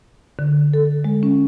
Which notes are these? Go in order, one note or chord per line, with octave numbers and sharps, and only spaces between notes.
D3
A4
G#3
C#4